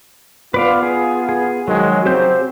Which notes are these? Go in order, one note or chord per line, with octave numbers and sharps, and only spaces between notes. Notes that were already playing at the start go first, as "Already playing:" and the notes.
B3 F4 B4 D5 F5
G#4
G#4
D#3 F3 F#3 G#3
C#3 F#3 C4 G4 C5 G6